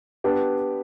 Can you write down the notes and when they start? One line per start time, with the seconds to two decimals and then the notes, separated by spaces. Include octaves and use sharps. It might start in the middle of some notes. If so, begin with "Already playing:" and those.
0.24 B3 D4 G4 B4 D5